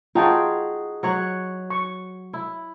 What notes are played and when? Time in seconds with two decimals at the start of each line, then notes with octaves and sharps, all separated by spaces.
0.15 D#4 F4 F#4 G#4 G5 A5
1.03 F#3 C#5 F#5
1.70 C#6
2.33 E4